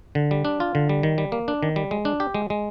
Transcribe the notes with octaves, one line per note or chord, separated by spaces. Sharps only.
D3
G3
D4
F4
D3
G3
D#3
G3
A#3
D4
D#3
G3
G#3
D4
G4
G#3
G#3